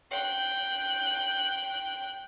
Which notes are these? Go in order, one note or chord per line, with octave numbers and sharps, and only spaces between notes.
G5 F#6